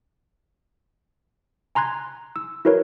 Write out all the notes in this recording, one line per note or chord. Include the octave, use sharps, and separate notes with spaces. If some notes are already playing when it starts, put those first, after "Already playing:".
G#5 A#5 C6 F#6 G#6
E6
E4 F#4 A#4 B4 C#5